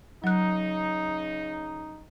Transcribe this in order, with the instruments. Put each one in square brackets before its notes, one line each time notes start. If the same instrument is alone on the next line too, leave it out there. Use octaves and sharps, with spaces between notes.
[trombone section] C#3 D#4 [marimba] F#3 F#6